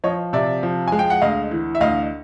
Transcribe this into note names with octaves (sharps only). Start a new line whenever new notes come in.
F3 C#5 D#5
C3 D5 E5
F3
G#3 G#5
G5
F#5
D2 D#5 F5
E3
E5
D2 D#5 F5